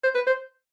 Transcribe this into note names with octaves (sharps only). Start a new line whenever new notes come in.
C5
B4
C5